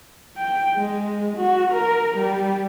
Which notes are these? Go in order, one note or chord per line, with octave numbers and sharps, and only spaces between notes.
G5
G#3
F#4
A#4
G3